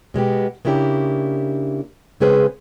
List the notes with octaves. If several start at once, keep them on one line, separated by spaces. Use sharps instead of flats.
B2 G#3 B3 G4
C#3 A#3 D4 E4 G4
C#3 G#3 C4 G#4 B4 C5